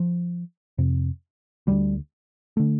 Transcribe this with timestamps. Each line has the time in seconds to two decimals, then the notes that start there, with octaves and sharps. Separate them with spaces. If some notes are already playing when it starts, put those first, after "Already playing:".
Already playing: F3
0.78 F2 C3
1.67 D2 D3 G3
2.57 D3 A3